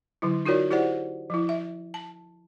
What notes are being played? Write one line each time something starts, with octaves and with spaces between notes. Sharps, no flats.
D3 F#3 E4
D#4 F4 F#4 A#4 C#5 D5
E4 G4 C5 D5 F#5
F3 E4
E5
A5